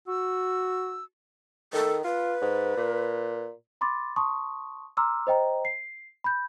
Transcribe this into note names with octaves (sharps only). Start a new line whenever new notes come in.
F#4 E6
D#3 A4
F4 B4
G#2
A#2
B5 C6 D6 A6
A5 C6 C#6 D#6
A#5 C6 D6 E6 F6
C5 D#5 G5 A#5
C7
B5 G6